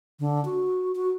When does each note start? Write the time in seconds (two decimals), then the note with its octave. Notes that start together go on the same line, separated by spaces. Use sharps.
0.20 D3
0.45 F#4
0.95 F#4